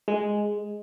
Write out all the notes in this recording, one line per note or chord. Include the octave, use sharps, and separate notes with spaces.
G#3